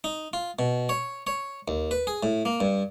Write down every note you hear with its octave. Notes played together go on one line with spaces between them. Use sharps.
D#4
F4
B2
C#5
C#5
D#2
B4
G#4
A2
A#3
G2